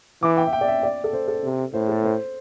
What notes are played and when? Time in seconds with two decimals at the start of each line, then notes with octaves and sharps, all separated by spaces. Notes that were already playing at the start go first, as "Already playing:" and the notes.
0.23 E3 D6
0.37 G5
0.47 E5
0.53 G5
0.61 D5
0.68 E5
0.83 D5
1.04 A4
1.13 C5
1.28 A4
1.43 C3
1.73 A2 C5
1.89 A4
2.04 C5